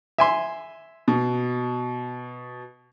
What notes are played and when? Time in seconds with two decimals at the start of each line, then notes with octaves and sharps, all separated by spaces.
0.18 E5 G#5 C6
1.08 B2